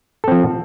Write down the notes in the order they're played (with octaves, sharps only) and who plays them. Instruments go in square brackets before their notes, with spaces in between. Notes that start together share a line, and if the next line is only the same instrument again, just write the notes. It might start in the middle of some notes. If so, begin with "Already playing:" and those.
[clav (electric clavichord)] A4
C4
F3